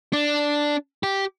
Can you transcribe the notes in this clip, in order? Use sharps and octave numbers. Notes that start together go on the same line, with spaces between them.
D4
G4